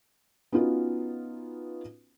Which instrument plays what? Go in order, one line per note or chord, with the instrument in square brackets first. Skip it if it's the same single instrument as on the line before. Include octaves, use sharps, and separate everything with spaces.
[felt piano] B3 C#4 D#4 F4 F#4 B4